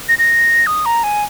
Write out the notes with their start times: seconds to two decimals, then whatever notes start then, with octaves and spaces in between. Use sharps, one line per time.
0.09 A#6
0.19 A#6
0.67 D#6
0.86 A#5
1.04 G#5